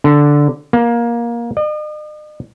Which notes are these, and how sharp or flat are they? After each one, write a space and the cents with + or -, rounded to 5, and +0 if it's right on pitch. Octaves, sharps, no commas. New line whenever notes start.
D3 -5
A#3 +15
D#5 -45